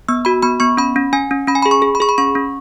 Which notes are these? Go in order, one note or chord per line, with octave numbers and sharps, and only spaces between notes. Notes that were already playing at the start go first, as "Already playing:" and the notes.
B3 E6
F#4 B5
B3 B5
B3 C#6
C#4 B5
C#4
C#4 G#5
C#4
C#4 B5
G#5
B5
G#4
C#6
G#4
B5
G#4 C#6
B5
C#4 C#6
C#4